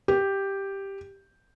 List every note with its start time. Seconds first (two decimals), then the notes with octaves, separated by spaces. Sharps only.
0.08 G4